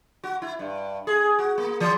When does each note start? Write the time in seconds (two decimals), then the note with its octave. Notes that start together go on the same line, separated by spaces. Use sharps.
0.23 F#4
0.42 E4
0.59 G2
1.07 G#4
1.38 F#4
1.58 A#3
1.80 E3